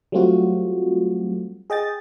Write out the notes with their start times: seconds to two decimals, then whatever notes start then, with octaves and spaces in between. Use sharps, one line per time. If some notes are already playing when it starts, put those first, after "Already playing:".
0.12 F#3 G3 A3 C4 F4 F#4
1.70 G#4 D#5 G5 A6